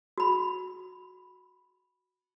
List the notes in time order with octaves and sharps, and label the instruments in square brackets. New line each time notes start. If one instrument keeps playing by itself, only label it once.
[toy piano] F#4 B5